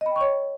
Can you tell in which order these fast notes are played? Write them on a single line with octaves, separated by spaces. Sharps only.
D#5 B5 G5 C#6 C#5